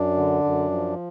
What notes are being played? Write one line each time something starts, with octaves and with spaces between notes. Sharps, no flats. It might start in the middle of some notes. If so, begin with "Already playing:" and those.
Already playing: F#2 D4
D3
F#2
F3